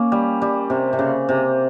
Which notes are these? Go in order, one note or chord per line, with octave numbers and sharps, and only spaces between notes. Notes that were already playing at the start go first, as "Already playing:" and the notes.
Already playing: A#3 C#4
G3
G3
C3
C3
C#3
C3